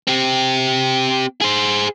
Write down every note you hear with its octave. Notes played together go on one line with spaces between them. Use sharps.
C4 G4
G#4 C5